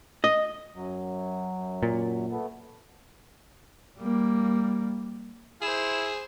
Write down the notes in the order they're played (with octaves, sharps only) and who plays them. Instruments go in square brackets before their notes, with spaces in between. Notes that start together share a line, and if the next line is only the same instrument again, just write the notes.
[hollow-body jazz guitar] D#5
[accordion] F#2 F#3
[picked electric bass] A#2
[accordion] A3 B3
[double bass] G3 A#3
[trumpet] E4 [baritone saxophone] G#4 [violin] C5 E7